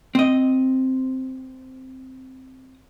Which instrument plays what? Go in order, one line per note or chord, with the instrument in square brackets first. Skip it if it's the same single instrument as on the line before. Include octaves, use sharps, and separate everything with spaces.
[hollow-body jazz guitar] C4 D#5